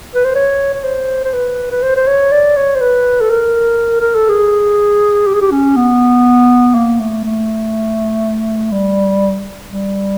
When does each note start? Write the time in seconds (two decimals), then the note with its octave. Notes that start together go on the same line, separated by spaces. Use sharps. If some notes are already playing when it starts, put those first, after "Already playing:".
0.15 B4
0.25 C5
0.35 C#5
0.74 C#5
0.84 C5
1.25 C5
1.33 B4
1.72 B4
1.82 C5
1.96 C5
2.07 C#5
2.32 D5
2.56 C#5
2.75 C5
2.81 B4
3.21 A4
3.30 A#4
4.01 A#4
4.15 A4
4.29 G#4
5.27 G4
5.34 G#4
5.41 G4
5.51 C#4
5.76 B3
6.75 A#3
6.99 A3
7.24 A3
8.72 G3
9.70 G3